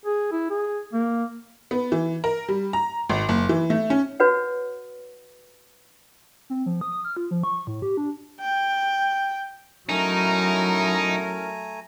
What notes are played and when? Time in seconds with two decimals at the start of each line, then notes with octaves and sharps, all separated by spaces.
0.06 G#4
0.32 E4
0.50 G#4
0.94 A#3
1.71 B3
1.92 E3
2.24 A#4
2.48 G3
2.73 A#5
3.10 G#1
3.29 F#1
3.49 E3
3.70 A3
3.90 C#4
4.20 F#4 B4 C#5 F#5
6.50 C4
6.66 F3
6.81 D#6
6.93 D#6
7.05 F6
7.17 F4
7.31 F3
7.44 C#6
7.67 A2
7.82 G4
7.97 D4
8.40 G5
9.89 F#3 A3 C#4 D#4 E4 A#4 G#5 A#5